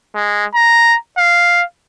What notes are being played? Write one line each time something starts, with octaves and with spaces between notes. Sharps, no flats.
G#3
A#5
F5